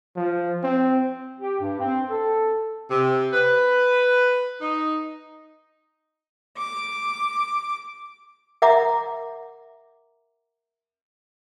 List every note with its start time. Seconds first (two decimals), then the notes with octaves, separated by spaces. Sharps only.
0.16 F3
0.63 C4
1.41 G4
1.60 G2
1.79 C4
2.10 A4
2.90 C3
3.33 B4
4.61 D#4
6.57 D6
8.62 A#4 E5 F#5 A#5 D6